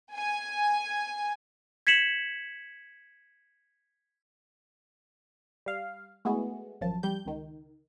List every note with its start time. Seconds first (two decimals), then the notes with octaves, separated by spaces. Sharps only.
0.14 G#5
1.87 G#6 B6 C#7 E7 F#7
5.66 G3 F5
6.25 G#3 A3 B3 E4 F#4 G#4
6.81 G#1 F#2 F3 A5
7.03 F2 G3 G4 G6
7.25 C#2 D#3